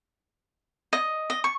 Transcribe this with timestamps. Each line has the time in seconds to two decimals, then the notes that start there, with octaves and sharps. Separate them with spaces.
0.93 D#5
1.30 D#5
1.44 C#6